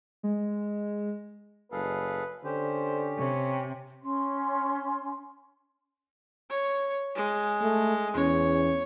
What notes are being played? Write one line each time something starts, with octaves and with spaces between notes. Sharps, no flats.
G#3
F#1 G#4 A4 B4 F5
D3 C#4 G4 C5
C3 C#5
C#4 C6
C#5
G#3
A3
E2 C#4 C#5